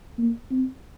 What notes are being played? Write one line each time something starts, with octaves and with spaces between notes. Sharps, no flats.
A#3
C4